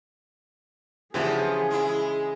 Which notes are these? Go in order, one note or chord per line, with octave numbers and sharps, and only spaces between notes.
C#3 E3 F3 B3 D4 G4 G#4
G#3 E4